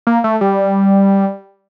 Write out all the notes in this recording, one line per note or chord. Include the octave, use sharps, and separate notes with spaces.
A#3
A3
G3